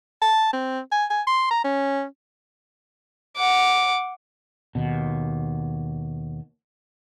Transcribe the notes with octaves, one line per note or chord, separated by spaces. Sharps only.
A5
C4
G#5
G#5
C6
A#5
C#4
F#5 D6
D#2 B2